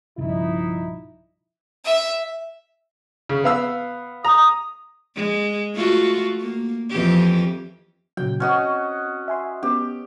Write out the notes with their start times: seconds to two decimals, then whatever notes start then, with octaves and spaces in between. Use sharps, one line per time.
0.18 B1 G2 C#3 F3 D#4 E4
1.85 E5
3.29 C#3
3.44 B3 F5 E6
4.25 A#5 D#6
5.15 G#3
5.74 A3 F4 F#4
6.41 A#3
6.90 F2 E3 G4
8.17 A#2 C#3 F#3 G5
8.40 C4 C#4 F#4 D#5
9.28 E5 G#5 C6
9.63 B3 C#4 G4